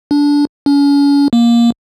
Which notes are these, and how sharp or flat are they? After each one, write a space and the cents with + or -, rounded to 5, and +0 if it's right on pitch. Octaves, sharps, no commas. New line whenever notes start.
D4 -20
C#4 +40
A#3 +15